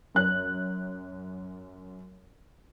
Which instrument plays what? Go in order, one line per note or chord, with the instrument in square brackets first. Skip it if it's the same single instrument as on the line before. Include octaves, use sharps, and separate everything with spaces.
[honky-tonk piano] F#2 F#6